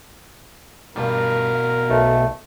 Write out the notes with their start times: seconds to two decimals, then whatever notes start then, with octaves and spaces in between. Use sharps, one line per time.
0.96 G2 B2 G3 F4 A#4
1.90 B1 A3